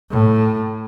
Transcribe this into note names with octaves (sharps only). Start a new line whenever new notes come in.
A2